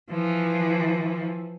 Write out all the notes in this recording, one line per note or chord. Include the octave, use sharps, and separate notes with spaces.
E3 F3